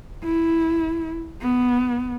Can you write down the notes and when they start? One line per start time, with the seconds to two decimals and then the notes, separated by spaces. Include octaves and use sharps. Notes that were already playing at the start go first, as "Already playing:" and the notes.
0.24 E4
1.42 B3